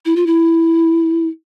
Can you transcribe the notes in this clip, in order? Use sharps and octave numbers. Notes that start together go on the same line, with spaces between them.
E4
F4
E4